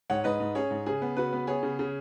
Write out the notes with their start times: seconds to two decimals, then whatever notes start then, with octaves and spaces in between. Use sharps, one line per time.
0.10 G#2 C#5 F#5
0.24 G#2 B4 D#5
0.40 G#2
0.55 C#4 G#4 C#5
0.70 G#2
0.86 C#3 G#4
1.02 B3
1.16 C#3 F#4 B4
1.33 B3
1.47 B3 G#4 C#5
1.63 C#3
1.79 C#3